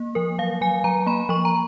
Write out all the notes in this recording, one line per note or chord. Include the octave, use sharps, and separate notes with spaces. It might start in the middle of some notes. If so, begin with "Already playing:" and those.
Already playing: A#3
F3 A#4
F#3 F5
F#3 G#5
F#3 A#5
A#3 B5
F3 C#6
A#5